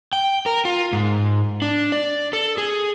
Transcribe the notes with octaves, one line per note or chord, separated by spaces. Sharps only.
G5
A#4
F4
G#2
D4
D5
A4
G#4